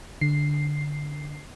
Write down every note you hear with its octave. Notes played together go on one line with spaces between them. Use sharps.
D3 C7